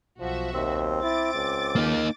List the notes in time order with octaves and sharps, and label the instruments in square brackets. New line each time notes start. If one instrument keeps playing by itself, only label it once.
[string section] B1 F#4 E5 [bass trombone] F3
[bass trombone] D#2 [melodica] C4
[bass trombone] E4 [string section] D6 A6
[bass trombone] C#2
[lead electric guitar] A#3 D#4